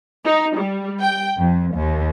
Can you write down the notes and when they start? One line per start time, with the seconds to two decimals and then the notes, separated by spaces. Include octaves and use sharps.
0.25 D#4
0.57 G3
1.01 G5
1.37 F2
1.74 D#2